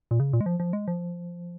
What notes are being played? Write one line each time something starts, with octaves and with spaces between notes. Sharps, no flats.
A#2
C#3
A#2
G#3
F3
F3
G#3
F3